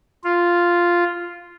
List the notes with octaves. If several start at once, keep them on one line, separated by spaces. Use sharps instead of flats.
F4